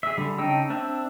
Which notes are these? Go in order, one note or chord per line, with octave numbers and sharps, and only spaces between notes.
G#4 E5
D3 G3
C#3 D4 D#4 G5 E6
C4 D4 E5